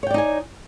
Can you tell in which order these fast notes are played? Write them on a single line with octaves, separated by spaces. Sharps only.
C#5 G5 D5 D#4 G#5